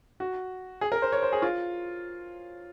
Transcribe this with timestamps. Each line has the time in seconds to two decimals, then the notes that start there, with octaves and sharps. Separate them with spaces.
0.20 F#4
0.81 G#4
0.92 A#4
1.02 C5
1.12 C#5
1.23 C5
1.32 G#4
1.42 F4